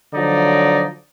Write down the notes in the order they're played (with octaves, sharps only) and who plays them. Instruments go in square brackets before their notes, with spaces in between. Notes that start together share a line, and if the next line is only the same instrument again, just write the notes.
[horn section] D3 F3 F#3 D#4 D5